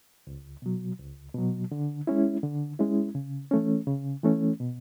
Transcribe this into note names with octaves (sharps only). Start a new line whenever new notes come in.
C#2
B2 F#3
C#2
B2 F#3
D3
G#3 C#4 E4
D3
G#3 C#4 E4
C#3
E3 A3 C#4
C#3
E3 A3 C#4
B2